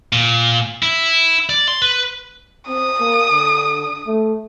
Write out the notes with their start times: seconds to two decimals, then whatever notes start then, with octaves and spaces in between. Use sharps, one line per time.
0.13 A#2
0.83 E4
1.49 D5
1.68 C6
1.82 B4
2.68 C4 D#6
3.00 A#3
3.31 D3
4.07 A3